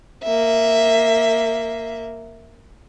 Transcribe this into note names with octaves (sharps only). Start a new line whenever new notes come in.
A#3 E5